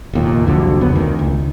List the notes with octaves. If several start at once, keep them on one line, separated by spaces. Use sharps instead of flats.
F1 D#2 A#2
C2 F2 D3 F#3
C2 F2 C#3 B3
D2 D#3
C#2